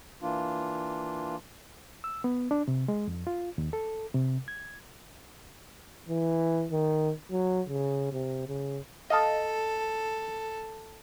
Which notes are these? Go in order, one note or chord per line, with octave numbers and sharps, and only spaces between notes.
E3 A#3 D4 F4
E6
B3
D4
C3
G#3
F2
F4
D#2
A4
C3
G#6
E3
D#3
F#3
C#3
C3
C#3
A4 D#5 F5 A5